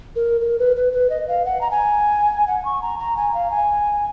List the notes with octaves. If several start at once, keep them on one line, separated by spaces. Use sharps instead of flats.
A#4
A#4
B4
B4
B4
D#5
F5
F#5
A#5
G#5
F#5
C#6
A#5
A#5
G#5
F5
G#5